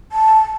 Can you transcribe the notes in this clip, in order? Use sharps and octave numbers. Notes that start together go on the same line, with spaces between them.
A5